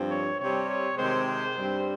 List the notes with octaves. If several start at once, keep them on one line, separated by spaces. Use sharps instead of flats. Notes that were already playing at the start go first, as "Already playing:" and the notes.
Already playing: G2 F3 C4
C#5
C3 G3 C4 C#5
C#5
C3 D#3 G#3 C4 C5
C5
G2 G3 C4